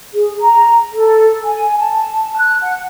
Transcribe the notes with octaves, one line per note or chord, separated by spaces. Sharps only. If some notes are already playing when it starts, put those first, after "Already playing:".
G#4
A#5
A4
G#5
A5
F#6
F#5